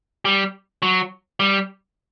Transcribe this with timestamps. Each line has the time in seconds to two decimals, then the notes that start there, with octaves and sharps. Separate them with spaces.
0.25 G3
0.82 F#3
1.40 G3